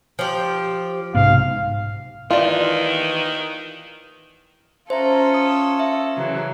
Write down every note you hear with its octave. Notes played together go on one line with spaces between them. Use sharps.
F3 G4
B1 G#2 C3 B3 F5
D#3 E3 F4 D5 E5 A5
C#4 F4 A4 C5 E5 A#5
D#6
E5
C#3 E3 F#3